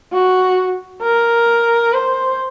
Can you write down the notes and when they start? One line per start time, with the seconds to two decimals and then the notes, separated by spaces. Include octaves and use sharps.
0.13 F#4
1.02 A#4
1.93 C5